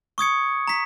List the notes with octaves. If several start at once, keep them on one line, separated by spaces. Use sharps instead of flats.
C#6 D#6 G#6 C#7
A#5 B6